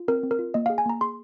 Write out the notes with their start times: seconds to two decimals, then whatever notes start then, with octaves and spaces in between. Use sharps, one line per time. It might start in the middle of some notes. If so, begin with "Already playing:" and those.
Already playing: F4
0.08 C4 A#4
0.23 C4
0.31 A#4
0.39 F4
0.54 A#3 D#5
0.66 G#4 F5
0.78 G#5
0.86 A#3 A#5
1.01 G#4 C6